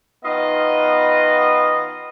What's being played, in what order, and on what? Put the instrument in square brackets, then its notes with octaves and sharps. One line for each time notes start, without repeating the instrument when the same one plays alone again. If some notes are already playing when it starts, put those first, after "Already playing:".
[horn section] D#3 B3 F4 D#5